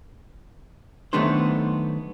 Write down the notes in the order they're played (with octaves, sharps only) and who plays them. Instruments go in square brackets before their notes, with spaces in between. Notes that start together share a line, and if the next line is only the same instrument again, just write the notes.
[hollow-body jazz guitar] D#3 F#3 A3 B3 D4 C5